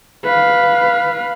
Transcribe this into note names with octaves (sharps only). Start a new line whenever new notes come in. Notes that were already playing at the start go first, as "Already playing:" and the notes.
B4 F5